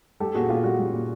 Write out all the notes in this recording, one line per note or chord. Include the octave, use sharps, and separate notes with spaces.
G3 G4 A4
A#2 F#4 G#4
A#2 F4 G4
G3 F#4
G3
A#2